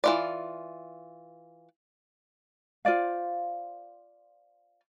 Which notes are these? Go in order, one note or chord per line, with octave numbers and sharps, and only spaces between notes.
E3 F4 D5
F4 C5 D5 F5